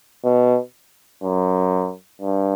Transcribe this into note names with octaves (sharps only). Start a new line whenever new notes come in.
B2
F#2
G2